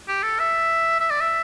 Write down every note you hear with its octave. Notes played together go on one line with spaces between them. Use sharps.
G4
A4
E5
E5
D5
E5